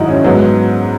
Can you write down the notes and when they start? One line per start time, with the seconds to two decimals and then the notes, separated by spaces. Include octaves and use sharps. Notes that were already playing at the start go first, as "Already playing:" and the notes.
Already playing: G#2 D#3 F#3 D#4 E4 F#4
0.08 C#4
0.24 G#2 F#3 B3